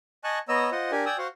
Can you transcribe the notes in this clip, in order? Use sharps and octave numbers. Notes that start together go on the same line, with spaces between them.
D#5 G#5 A5 C#6 F#6
B3 C#5 D#5 A#5 E6
F4 C5 D#5 F#5
D4 G4 A#4 G#5
D5 G5 G#5 D#6 E6
F#4 C5 F5 F#5